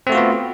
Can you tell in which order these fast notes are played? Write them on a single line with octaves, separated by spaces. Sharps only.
C4 A3 F#4 F4 B3